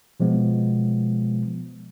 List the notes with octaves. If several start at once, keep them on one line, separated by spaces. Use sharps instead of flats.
B2 F3 G#3 B3